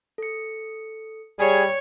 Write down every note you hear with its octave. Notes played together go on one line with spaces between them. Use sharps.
A4 C#7
G3 G#4 C#5